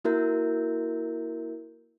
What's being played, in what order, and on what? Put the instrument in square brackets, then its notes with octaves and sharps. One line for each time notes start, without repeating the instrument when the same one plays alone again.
[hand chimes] A#3 E4 F#4 A#4 E5 G6